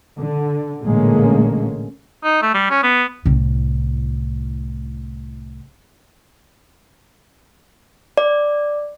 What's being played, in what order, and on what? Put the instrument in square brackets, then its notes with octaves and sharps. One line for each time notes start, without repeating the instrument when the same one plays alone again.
[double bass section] D3
A1 A#2 D3 G#3 A#3 C#4
[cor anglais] D#4
A3
G3
C#4
B3
[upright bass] C2 A2
[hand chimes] D5